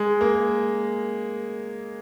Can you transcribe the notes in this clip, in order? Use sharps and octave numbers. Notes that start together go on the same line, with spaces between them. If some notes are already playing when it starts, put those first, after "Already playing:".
Already playing: G#3
A#3